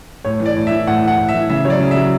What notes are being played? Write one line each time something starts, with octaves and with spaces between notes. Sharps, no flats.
A2 C#5
E3
D5
A2
E3 E5
A2 F#5
E3 F#5
A2
E5
E3
C#3 E5
F#3 C#5 D5
C#3
E5
F#3